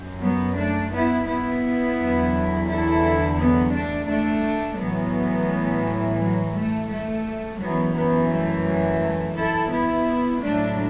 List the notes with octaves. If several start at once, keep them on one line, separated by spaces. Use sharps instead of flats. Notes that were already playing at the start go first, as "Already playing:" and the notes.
Already playing: F#2
F#3 B3
A3 D4
B3 E4
B3 E4
E2 D3 F#3
E4 A4
F#3 B3
A3 D4
A3 D4
A2 E3 F#3 B3
F#3
A3
A3
F#2 E3 F#3 B3
F#3 B3
A3
F#3
A3
E4 A4
B3 E4
A2 F#3 A3 D4